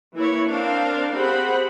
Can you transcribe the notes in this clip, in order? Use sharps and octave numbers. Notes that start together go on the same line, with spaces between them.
E3 A#3 E4 C#5
C4 D4 A#4 F5
C4 G4 G#4 C5 F#5 B5